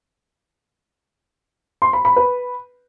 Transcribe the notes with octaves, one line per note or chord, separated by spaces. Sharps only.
C6
B5
B5
B4